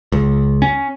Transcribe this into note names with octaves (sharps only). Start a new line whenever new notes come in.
C#2
C#4